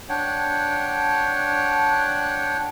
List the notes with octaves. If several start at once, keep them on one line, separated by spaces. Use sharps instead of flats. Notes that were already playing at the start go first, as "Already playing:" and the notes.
D4 C#5 F#5 G5